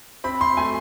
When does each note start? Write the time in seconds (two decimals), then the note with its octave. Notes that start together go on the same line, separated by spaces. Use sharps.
0.24 C4 B5
0.41 C6
0.57 A3 G#5